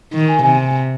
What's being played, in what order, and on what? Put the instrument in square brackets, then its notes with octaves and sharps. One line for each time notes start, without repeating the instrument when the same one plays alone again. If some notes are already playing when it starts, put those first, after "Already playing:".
[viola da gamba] D#3
[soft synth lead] G#5
[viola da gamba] C3 [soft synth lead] G#5